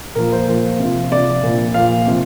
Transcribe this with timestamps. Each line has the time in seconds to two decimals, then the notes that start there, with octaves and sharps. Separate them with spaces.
0.15 A#2 F3 A#4
0.32 C5
0.48 A#2 F3
0.79 C3 F3
1.11 C3 F3 D5
1.43 A#2 F3
1.74 A#2 F3 F5
2.07 C3 F3